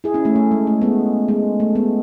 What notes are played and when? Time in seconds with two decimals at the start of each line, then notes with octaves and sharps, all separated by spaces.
0.04 E4 G#4
0.14 C#4 E4
0.25 A3 C#4
0.36 A3
0.51 G#3
0.67 A3
0.82 G#3 B3
1.28 G#3
1.60 A3
1.75 G#3 B3